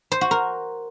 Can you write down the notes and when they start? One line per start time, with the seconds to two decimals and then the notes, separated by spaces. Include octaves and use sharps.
0.12 C5
0.21 F#4
0.31 A#4